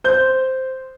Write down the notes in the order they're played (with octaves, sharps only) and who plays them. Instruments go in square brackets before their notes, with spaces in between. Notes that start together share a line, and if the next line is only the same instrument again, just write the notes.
[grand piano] C5 G6